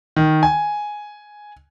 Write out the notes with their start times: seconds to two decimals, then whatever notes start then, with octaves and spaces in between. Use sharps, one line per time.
0.16 D#3
0.43 G#5